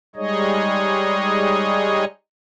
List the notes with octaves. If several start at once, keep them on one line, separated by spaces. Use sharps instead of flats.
G3 G#3 D#4 G#4 C#5 D#5